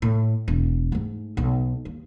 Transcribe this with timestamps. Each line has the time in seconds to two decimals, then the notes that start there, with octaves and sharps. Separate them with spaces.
0.02 A2
0.48 E1
0.92 G#2 A3
1.37 B1
1.85 D#2